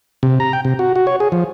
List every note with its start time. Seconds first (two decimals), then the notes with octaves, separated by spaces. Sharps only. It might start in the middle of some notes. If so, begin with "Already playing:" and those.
0.23 C3
0.40 A#5
0.53 G5
0.65 C3
0.79 F#4
0.96 F#4
1.07 C#5
1.20 G#4
1.32 F3